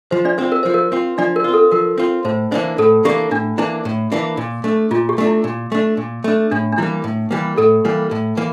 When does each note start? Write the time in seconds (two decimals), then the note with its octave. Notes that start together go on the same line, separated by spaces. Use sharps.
0.11 F3 C5
0.25 D4 D5
0.38 C4 F4 C5
0.52 A#4
0.63 F3 C5
0.74 A#4
0.92 C4 F4
1.18 F3 D4 D5
1.36 A#4
1.44 C4 F4
1.54 A4
1.71 F3 A#4
1.98 C4 F4
2.25 A2 C5
2.51 E3 A#3 D4 C5
2.78 A2 A4
3.05 E3 A#3 D4 G4
3.31 A2 D4
3.58 E3 A#3 D4 E4
3.85 A2
4.12 E3 A#3 D4
4.37 A#2
4.64 A3 D4
4.91 A#2 F4
5.09 G4
5.18 A3 D4
5.27 E4
5.44 A#2
5.72 A3 D4
5.97 A#2
6.24 A3 D4
6.51 A2 D4
6.72 D4
6.78 E3 G3 A#3 E4
7.04 A2
7.31 E3 G3 A#3
7.57 A2 A4
7.85 E3 G3 A#3
8.11 A2
8.37 E3 A#3